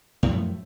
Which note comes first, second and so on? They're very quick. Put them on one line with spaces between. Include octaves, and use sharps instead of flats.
A2 F#2 F3 A3